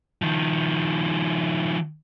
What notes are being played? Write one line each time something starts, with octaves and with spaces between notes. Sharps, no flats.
D#3 F3